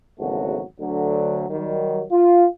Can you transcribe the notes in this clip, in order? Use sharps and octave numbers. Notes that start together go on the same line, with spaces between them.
G#1 E2 C#3 F#3 A3 F#4
D2 D3 F#3
D#3 F#3 G3
F4